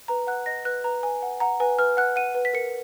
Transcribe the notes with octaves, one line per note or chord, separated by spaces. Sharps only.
B4 A#5
F#5 F#6
D#5 A#6
B4 F#6
B4 A#5
B4 G#5
F#5
F#5 A#5
B4 G#5
B4 F6
F#5 F#6
F#5 D#7
B4
B6
A#4 C#7